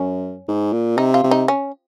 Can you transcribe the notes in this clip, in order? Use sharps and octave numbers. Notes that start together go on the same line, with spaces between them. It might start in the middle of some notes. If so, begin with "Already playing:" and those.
Already playing: F#2 C#4
G#2
A#2
C3 D#4
F4
C3
D#4
C#4